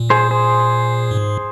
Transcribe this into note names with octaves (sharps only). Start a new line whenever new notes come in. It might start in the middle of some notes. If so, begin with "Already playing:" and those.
Already playing: A#2
G#4 C5
G#4 C5
G#2